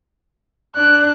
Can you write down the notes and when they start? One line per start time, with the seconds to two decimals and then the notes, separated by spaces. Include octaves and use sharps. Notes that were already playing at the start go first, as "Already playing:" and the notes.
0.76 D4 D5 F#6